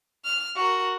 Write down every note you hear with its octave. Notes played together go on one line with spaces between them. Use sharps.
F6
F#4 A#4